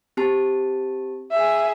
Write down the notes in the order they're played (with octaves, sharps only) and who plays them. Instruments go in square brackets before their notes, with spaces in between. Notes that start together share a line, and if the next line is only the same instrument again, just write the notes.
[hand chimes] C4 G4 A5
[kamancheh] G#4 E5